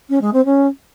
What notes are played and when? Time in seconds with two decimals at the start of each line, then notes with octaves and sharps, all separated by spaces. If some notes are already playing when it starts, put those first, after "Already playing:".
0.09 C#4
0.21 G#3
0.33 C4
0.45 C#4